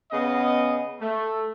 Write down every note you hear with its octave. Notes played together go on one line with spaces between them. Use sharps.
C#3 B3 D#5
A3